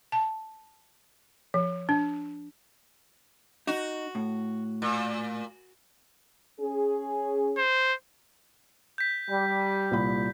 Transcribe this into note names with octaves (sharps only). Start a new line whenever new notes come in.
A5
F3
D4
D#4 F#4
A2
A#2
C#4 G#4
C5
G6 B6
G3
C2 A#2 B5